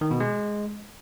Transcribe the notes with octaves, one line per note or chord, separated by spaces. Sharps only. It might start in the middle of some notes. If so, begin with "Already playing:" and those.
D#3
B2
G#3